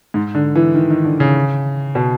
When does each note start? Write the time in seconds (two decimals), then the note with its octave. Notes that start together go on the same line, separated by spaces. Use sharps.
0.14 G#2
0.35 D3
0.55 E3
0.75 D#3
0.90 D#3
1.05 D3
1.20 C#3
1.95 B2